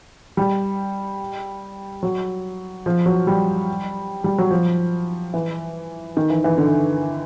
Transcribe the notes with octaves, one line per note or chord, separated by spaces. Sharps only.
G3
F#3
F3
F#3
G3
G3
F#3
F3
E3
D#3
E3
E3
D3